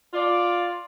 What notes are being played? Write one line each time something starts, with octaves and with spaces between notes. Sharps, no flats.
F4 D5